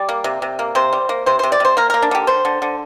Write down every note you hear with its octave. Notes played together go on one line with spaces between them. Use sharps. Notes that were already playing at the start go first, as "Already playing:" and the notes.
Already playing: G3 D5
A#3
C3
C3
A#3
C3 C5
G3
A#3
C3 C5
C3 C5
D5
C3 C5
A#3 A#4
A#3 A#4
D4
D3 G4
D3 C5
D3
D3